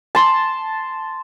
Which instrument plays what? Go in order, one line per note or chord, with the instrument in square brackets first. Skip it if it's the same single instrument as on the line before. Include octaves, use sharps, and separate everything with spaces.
[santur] A5 C6